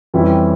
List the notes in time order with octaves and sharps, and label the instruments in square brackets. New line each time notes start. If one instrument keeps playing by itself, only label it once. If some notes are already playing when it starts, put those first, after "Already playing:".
[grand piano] F2 E3 G3 C#4 E4